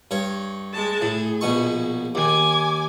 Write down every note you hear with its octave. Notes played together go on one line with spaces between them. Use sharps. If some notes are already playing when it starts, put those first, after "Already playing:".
G2 C#5
G#3 A5
A2 G#4
A#1 B2 C#6
D#2 G#5 D6